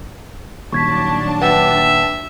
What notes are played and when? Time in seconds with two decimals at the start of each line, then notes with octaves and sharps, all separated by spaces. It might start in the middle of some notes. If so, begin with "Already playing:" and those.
0.72 D#1 D#2 F#3 D4 A5 C#6 G#6 B6
1.41 B4 E5 F#5 G5